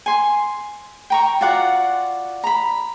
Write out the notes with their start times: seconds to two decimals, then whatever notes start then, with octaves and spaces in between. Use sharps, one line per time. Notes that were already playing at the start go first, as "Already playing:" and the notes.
0.06 G#5 C6
1.10 G5 A#5 C#6
1.41 F4 F#4 D5 F#5
2.44 A#5 B5